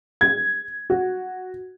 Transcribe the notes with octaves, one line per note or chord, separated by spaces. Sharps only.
G#6
F#4